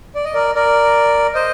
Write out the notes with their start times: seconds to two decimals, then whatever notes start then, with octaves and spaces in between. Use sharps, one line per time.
0.15 D5
0.25 D#5
0.34 A#4 D5
0.55 A#4 D5
1.34 C5 D#5